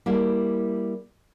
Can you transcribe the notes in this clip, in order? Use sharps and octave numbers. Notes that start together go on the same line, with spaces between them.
G3 A#3 E4